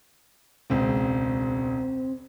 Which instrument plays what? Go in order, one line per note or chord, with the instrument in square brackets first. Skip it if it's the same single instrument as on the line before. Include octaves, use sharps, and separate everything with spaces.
[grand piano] E1 C#2 [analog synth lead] C4